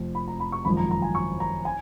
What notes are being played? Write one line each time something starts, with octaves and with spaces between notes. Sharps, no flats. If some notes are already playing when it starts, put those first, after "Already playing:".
Already playing: F1 F2 F3
B5
A#5
B5
C#6
G#1 F#2 F3 B5
A#5
A#5
G#5
C#6
A#5
G#5